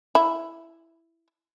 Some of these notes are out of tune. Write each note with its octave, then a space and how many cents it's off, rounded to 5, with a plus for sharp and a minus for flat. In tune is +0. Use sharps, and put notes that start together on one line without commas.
E4 +5